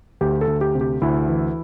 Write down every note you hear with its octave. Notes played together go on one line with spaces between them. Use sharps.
D2 G4
A4
D2
G4
C3
G4
D2 E4
E3